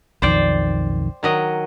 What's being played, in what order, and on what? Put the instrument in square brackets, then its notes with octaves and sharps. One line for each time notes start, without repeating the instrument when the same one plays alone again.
[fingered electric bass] B1 F2 D#3 [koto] C5 D5 G5
[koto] D#3 F#3 D#5